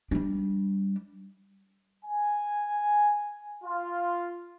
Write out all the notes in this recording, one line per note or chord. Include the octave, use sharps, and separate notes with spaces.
G3 D4
G#5
F4